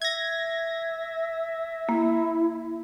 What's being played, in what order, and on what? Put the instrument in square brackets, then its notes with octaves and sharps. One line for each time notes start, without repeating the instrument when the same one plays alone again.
[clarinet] E5 [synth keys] G#6 A#6
[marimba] A#3 [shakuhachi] E4